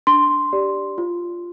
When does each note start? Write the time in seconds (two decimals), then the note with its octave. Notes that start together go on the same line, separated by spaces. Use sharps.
0.07 D4 C6
0.53 G4 D5
0.98 F4